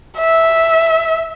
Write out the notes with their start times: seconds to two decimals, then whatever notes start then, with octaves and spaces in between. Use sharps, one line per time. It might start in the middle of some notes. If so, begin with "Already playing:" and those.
0.19 E5